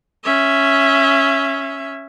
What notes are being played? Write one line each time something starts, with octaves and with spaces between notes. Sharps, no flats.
C#4 E5